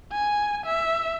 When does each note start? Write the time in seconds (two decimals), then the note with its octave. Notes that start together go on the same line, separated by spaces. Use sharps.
0.12 G#5
0.66 E5